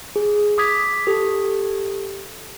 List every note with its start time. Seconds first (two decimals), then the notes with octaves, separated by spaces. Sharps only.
0.16 G#4
0.58 D6 D#6 G#6 B6
1.07 G4 A4